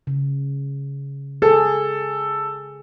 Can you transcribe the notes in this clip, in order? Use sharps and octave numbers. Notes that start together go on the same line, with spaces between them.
C#3
G#4 A4